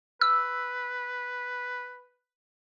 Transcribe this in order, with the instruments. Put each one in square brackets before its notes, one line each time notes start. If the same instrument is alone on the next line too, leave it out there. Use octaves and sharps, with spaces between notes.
[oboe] B4 [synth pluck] E6